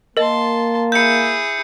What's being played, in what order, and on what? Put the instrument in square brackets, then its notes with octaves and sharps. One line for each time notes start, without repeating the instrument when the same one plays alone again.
[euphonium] A#3 [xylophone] A#4 D#5 [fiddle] A5 C6
[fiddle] E4 G#4 [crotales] G6 C#7